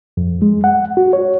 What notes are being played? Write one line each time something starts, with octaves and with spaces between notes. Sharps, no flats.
F2
G#3
F#5
F#4
C#5